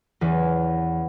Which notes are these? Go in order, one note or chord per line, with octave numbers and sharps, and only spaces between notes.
E2 E3 C#4